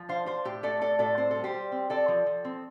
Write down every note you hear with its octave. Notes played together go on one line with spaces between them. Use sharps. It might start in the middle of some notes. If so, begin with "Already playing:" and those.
Already playing: F3
D4 C5 F5
D4 C5 F5
A2 G4
A3 A4 D5
A2 A4 D5
A2 A4 D5
C4 C5
G3 A4
G4 C5
G3
C4
C4 A4 D5
F3
F3
C4